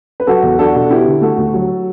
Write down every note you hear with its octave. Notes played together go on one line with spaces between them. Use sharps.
B4
F#3 F#4 A4
E2
D4 F#4 A4
B2
B3 E4 G4
D3
A3 F#4 A4
D2
F#3